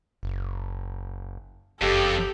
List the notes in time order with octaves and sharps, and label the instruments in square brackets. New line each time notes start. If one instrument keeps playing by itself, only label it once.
[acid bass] F#1
[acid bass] F#1 [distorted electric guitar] F2 [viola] G4 A4